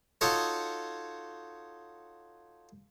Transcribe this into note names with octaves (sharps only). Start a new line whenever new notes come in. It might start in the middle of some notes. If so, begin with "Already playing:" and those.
D#4 F4 F#4 A4 C#5 D#5